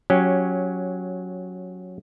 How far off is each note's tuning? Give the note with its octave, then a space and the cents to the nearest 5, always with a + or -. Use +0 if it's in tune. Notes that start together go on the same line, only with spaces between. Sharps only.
F#3 -15 C#4 +0 G4 +0